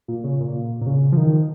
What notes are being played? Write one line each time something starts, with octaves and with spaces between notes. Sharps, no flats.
A#2
C#3
A#2
A#2
C#3
F3
D#3